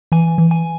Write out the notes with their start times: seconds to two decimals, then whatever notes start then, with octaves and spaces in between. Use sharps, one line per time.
0.12 E3 G#5
0.38 E3
0.51 G#5